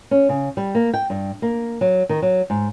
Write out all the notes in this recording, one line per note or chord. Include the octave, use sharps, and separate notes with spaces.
C#4
C#3
G3
A#3
G5
G2
A#3
F#3
D#3
F#3
G#2